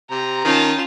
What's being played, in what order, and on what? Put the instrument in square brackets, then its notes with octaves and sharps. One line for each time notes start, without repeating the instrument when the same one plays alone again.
[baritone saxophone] C3 [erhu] A#5
[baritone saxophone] D#3 [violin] C#4 [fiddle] F4 A5